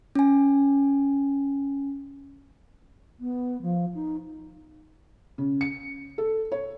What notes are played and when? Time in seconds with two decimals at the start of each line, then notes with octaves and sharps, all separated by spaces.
0.15 C#4 G#5
3.20 B3
3.62 F3
3.95 D#4
5.38 C#3
5.61 C#7
6.18 A4
6.52 C#5